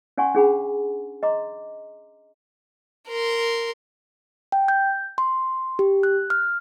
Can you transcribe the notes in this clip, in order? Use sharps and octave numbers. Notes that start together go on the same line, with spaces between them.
C#4 D5 F#5 G#5 C6 C#6
C#4 D4 G#4 F#5 B5
D#5 A#5 C6 D6
A#4 C6
G5
G6
C6
G4
F#6
F6